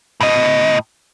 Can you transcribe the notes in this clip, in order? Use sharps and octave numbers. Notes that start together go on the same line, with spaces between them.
A2 D#5